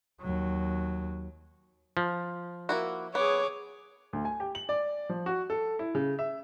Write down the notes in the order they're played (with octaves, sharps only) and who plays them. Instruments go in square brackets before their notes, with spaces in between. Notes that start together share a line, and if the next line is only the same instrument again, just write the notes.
[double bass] D#2 F#3
[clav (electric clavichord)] F3
[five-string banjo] A#3 E4 F#4
[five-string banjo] B3 [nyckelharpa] G#4 D6 [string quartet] C#5
[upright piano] D2
G#5
G4
F#7
D5
F3
F#4
A4
E4
C#3
E5